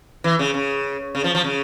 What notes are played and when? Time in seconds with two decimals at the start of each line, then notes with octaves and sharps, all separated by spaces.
0.24 E3
0.39 C#3
0.54 C#3
1.15 C#3
1.24 F3
1.35 F3
1.44 C#3